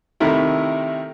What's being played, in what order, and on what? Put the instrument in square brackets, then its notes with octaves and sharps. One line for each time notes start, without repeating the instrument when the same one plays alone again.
[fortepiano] C3 D#3 A3 E4 A#4